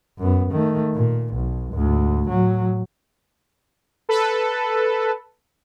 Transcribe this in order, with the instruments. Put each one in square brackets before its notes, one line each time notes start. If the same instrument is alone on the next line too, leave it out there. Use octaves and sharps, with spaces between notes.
[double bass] F#2 B3
D#3 A3
A#2
B1
D2 G#2
A2 F#3
[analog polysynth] A4 B4